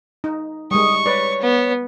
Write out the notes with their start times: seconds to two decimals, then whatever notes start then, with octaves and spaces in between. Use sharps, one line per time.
0.24 D#4
0.71 G3 G#3 C#6 D#6
1.06 B4 C#5 D5
1.42 B3